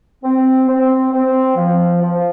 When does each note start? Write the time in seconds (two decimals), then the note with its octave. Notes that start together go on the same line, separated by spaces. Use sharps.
0.24 C4
0.69 C4
1.13 C4
1.57 F3
2.01 F3